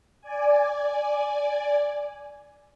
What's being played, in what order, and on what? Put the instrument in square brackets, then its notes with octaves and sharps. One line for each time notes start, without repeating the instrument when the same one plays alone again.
[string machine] D5 G#5